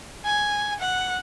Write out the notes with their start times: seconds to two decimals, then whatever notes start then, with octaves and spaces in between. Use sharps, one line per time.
0.25 G#5
0.80 F#5